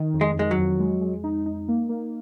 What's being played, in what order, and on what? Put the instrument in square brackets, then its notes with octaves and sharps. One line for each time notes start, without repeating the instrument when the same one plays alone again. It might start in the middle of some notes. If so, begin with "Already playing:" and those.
Already playing: [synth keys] D#3 D#4
F2
[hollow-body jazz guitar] G#3
[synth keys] F2 [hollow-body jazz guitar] G#3
[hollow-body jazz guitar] F#3
[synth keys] F2
G#3
G#3
D#4
D#4
A#3
A#3